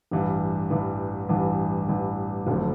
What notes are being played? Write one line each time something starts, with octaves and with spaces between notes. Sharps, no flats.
A1 G2 E3
A1 G2 E3
A1 G2 E3
A1 G2 E3
F#1 F2 D3 F#3 A3